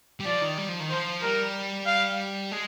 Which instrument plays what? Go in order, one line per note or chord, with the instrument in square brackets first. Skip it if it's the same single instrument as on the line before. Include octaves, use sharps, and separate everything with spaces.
[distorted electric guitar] G3
[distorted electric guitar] F3 [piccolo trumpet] D5
[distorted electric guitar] D#3
G3
F3
D#3
[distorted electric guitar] F3 [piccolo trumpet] C5
[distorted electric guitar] G3 [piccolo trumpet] A#4
[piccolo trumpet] F5
[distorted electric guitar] G#3